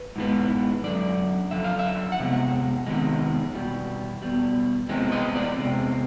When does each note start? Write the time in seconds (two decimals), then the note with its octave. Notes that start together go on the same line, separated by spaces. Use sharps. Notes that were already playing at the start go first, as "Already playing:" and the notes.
Already playing: B4
0.16 G#2 E3 G#3 B3
0.84 F#2 D3 F3 D5
1.51 F#2 D3 F3 E5
1.64 F5
1.79 E5
2.12 F#5
2.19 E2 C3 G#3
2.87 E2 C3 D#3 G#3
3.54 E2 B2 G3
4.22 E2 B2 G3
4.89 E2 C3 E3 G#3 C4
5.12 D#5
5.35 D5
5.57 E2 C3 G#3 C4